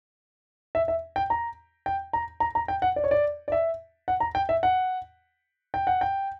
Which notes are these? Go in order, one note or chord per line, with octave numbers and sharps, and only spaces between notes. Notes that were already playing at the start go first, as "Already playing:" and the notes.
E5
E5
G5
A#5
G5
A#5
A#5
A#5
G5
F#5
D5
C#5
D5
D5
E5
F#5
A#5
G5
E5
F#5
G5
F#5
G5